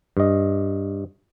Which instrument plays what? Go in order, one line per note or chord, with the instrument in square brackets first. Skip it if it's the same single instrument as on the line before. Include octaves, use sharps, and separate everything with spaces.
[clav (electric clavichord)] G2 D#5